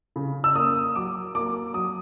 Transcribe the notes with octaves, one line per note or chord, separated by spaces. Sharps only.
C#3
E6
A#3 D#6
F#3 D6
A#3 D6
F#3 D#6